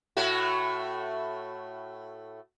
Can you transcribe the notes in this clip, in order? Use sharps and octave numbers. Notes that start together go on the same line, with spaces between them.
A2 A3 F#4